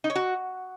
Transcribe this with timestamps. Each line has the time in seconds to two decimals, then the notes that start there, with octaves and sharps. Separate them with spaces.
0.04 D#4
0.10 C#5
0.15 F#4